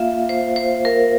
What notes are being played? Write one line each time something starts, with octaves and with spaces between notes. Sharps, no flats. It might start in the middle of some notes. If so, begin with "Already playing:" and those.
Already playing: A#3 F4 E5 F5
C5
C5
A#4